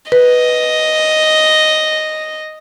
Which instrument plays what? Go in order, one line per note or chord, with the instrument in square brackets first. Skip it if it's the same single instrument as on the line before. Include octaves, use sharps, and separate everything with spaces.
[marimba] B4 [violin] D#5